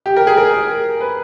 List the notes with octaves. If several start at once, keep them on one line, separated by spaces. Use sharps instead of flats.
G4
A#4
G#4
A#4
B4